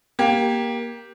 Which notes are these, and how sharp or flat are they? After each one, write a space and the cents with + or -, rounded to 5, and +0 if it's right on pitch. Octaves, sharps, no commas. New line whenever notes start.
A#3 +15 G4 +0